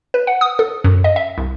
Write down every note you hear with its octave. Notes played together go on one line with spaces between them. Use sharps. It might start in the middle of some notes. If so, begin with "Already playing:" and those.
B4
F#5
D#6
A4
F#2
D#5
E5
C2